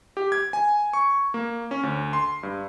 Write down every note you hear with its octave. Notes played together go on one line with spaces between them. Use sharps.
G4
G#6
G#5
C#6
A#3
C#4
D2
C6
G2